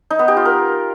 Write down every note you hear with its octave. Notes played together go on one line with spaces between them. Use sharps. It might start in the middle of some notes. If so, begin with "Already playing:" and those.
D#4
B3
G4
F4
A#4